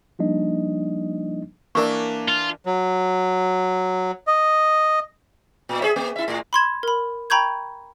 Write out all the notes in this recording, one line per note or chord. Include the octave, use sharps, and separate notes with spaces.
F3 G3 A#3 D4 D#4 D#5
E3 A#3 D4 A#4 C#6
F4
F#3
D#5
A#2
G#4 C5 E5
A#3
E4 E5
A2
B5 C6 G#6 E7
A#4 B5
G5 A#5 B5 C#6 G6 G#6